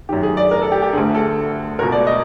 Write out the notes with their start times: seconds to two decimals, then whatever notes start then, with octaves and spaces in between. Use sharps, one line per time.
0.09 F#2 D#3 G4
0.23 G#4
0.37 D5
0.51 A#4
0.62 A4
0.72 G4
0.82 G4
0.93 D2 D3 G#4
1.15 A4
1.79 C#2 B2 A#4
1.92 D5
2.07 D#5